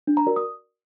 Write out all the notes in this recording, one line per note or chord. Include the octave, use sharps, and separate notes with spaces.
D4
A#5
F#4 A#4 D5
D#6